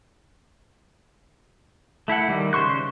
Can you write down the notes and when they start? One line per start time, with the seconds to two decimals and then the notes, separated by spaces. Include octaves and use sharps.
2.08 A3 E4 A4 F#5
2.28 D#3 G3
2.53 C#3 C5 C6 C#6 F#6